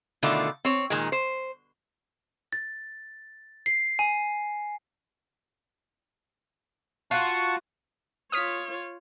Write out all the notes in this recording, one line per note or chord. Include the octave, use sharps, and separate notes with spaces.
B2 D3 D#3 A3 F4 D5
C4 C#5
A#2 D#3 G#3
C5
A6
C7
G#5
F4 F#4 F#5 A5 C#6
F4 C#5 D#6 F6 B6